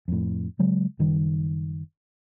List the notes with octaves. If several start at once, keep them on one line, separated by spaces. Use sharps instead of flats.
F2 A2
C#3 F#3 G#3
F#1 D#3 G3